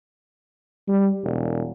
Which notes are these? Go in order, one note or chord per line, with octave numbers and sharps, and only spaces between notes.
G3
E1